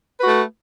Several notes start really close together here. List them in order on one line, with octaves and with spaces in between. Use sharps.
B4 F#4 A3